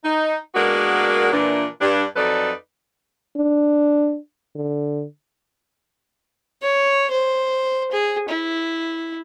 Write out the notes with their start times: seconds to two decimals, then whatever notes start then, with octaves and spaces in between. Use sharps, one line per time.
0.03 D#4
0.55 G#3 A#3 B3 D4 F#4 A#4
1.32 A#2 E3 D4
1.80 G2 D4
2.15 F2 F#3 D#4 A4 B4 D5
3.37 D4
4.55 D3
6.62 C#5
7.11 C5
7.91 G#4
8.28 E4